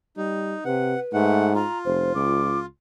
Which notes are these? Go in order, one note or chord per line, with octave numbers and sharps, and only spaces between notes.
G3 D#4
C3 B4 F#5
G#2 A3 F#5
F4 A#5
F1 C5
C#2 D6